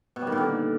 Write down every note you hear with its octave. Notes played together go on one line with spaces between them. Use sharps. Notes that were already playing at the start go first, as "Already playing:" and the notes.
B2
G3
D#3
A#2
D3